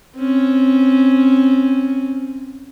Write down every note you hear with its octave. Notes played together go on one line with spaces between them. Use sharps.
C4 C#4